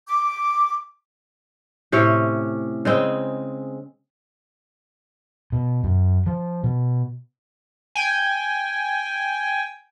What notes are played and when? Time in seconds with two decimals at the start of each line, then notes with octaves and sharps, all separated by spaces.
0.07 D6
1.92 A2 C3 C#4 C#5
2.85 C#3 G#3 C4
5.52 B2
5.84 F#2
6.26 F3
6.64 B2
7.95 G5 G#5